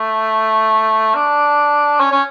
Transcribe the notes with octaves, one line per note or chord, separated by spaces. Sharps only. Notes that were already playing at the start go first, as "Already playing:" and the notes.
Already playing: A3
D4
C#4
C#4